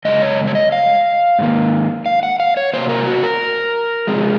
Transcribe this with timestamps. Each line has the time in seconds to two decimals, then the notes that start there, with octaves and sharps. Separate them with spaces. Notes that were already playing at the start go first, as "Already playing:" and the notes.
0.05 F#2 C#3 G#3 D#5
0.22 C#5
0.47 C#5
0.55 D#5
0.72 F5
1.39 G#2 D#3 A#3
2.06 F5
2.23 F#5
2.40 F5
2.57 C#5
2.73 C3 F#3 A#3 C5
2.89 A#4
3.07 F#4
3.23 A#4
4.07 C3 F3 G#3